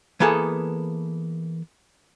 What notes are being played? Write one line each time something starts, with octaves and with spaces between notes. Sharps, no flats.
E3 A#3 B3 G#4 A4